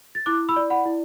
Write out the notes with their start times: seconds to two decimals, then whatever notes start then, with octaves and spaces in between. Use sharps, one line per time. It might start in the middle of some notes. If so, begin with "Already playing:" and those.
0.15 A6
0.26 E4 D6 F#6
0.49 B5 E6
0.56 D5
0.70 F#5 B5
0.85 E4